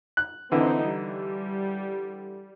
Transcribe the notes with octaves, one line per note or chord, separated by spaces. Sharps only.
F#6
D3 E3 C4 D#4 E4
G3